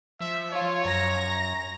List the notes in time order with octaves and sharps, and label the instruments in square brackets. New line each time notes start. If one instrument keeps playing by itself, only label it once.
[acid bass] F3 [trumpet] E5
[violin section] F4 [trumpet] C#5
[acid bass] F#2 [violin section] A#5 A#6